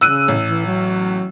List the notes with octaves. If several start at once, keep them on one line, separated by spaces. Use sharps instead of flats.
C#3 E6 F#6 D#7
A1
E3
F#3